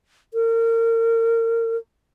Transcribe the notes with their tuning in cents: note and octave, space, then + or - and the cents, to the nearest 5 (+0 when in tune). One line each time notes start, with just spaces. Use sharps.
A#4 -30